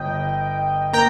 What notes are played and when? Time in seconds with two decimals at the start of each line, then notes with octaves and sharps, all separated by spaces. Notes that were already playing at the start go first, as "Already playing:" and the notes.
Already playing: G1 D#5 G5
0.93 A#3 G5 A#5